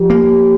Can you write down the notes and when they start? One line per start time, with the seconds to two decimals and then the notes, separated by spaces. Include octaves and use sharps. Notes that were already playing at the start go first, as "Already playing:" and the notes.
Already playing: F3 G4
0.10 A#3